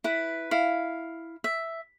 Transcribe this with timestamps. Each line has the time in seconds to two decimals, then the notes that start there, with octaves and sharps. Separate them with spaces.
0.04 E4 B4
0.51 E4 F5
1.44 E5